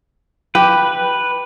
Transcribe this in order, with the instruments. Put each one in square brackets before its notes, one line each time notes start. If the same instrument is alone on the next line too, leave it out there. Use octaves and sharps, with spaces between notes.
[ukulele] G4 [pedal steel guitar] B4